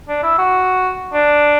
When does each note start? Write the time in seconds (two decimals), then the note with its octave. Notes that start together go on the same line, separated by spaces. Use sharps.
0.09 D4
0.23 E4
0.38 F#4
1.13 D4